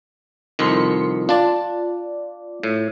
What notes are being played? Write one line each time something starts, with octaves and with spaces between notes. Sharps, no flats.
C2 F2 D#3 C6 B6 C#7
D4 F4 D5 A5
A2